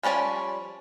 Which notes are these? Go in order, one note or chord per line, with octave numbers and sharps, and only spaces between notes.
F3 G3 C#4 D5 G#5